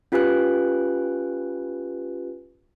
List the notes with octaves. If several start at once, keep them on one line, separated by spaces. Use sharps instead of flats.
C#4 F4 G4 B4 G#5 F#6